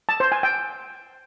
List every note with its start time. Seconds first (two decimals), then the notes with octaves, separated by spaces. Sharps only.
0.09 A5
0.20 C5
0.32 G#5
0.43 G5